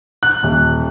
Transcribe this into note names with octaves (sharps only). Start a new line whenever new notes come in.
F#6
D#1